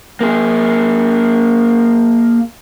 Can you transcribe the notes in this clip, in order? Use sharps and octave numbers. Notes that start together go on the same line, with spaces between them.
A#3 G#4